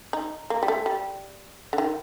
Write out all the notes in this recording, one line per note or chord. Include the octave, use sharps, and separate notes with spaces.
D#4
A#3
G3
A3
G3
D3
D#3